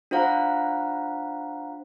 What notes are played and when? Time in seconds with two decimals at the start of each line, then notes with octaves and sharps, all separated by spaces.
0.11 D4 F4 C5 F5 F#5 A#5